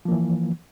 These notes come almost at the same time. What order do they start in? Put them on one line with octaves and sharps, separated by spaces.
F3 A#3 E3